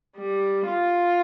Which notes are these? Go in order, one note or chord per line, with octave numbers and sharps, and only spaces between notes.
G3
F4